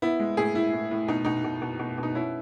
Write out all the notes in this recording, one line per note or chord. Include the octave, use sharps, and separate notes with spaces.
B3 E4
G#3
A2 E4 G#4
A2 E4
A2
A2
B2 D#4
B2 D#4
B2
B2
B2
B2
D#4
C#4 E4